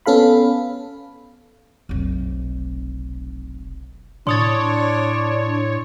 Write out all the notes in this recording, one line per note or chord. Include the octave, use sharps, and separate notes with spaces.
B3 C#4 A4 F5 B5
F1 B1
A2 D4 C#5 C6 D#6 A6